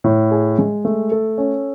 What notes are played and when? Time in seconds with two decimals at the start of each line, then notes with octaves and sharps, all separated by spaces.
0.04 A2
0.31 G#4
0.59 G#3
0.85 A3
1.12 A4
1.38 C#4